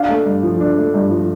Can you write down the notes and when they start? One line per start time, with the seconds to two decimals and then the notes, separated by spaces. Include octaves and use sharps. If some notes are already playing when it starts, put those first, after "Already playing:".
Already playing: D4 F5
0.09 A3
0.26 G2
0.43 F3
0.60 D4
0.78 A3
0.94 G2
1.11 F3